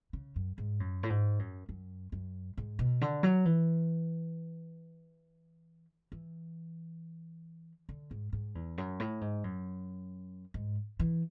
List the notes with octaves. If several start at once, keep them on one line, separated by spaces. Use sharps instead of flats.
C#3
F#2
G#2
F#2
A2
G#2
F#2
F#2
F#2
G#2
B2
D3
F#3
E3
E3
D3
G#2
G#2
E2
F#2
A2
G#2
F#2
G#2
E3